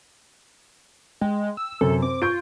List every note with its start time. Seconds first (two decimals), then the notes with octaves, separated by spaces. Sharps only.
1.21 G#3 G5
1.57 E6
1.81 F#2 C3 A4
2.02 C4 D6
2.22 F4 C#6 G6 D7